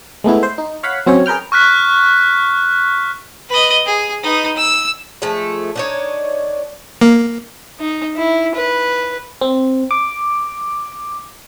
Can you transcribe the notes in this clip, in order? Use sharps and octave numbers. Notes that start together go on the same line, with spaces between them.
G#3 A3 B3 E4
C5
D#4
C#5 F5 F#5 B5
F#3 C4 C#4 C#5
G#4 A#4 B4 G5 F6
C#6 F6 F#6 B6
B4 D#5
G#4
D#4 B4
E6
F3 G#3 A3
D4 D#4 C#5
A#3
D#4
E4
B4
C4
D6